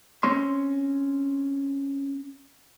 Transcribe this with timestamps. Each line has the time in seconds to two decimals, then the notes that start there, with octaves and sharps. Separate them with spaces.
0.23 C4 C#4 C#5 C6